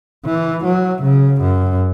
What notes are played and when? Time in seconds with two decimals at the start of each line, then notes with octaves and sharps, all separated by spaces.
0.26 E3
0.64 F#3
1.03 C#3
1.42 F#2